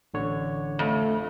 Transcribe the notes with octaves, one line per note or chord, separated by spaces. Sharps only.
A1 D3 C#5
F2 A3